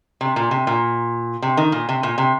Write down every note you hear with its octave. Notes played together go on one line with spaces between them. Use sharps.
C3
A#2
C3
A#2
C3
D#3
A#2
C3
A#2
C3